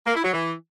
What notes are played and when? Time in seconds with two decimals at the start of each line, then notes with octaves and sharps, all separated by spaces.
0.06 A#3
0.15 E4
0.24 F#3
0.33 E3